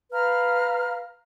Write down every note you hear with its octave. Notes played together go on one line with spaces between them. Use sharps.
B4 F5 A#5 F6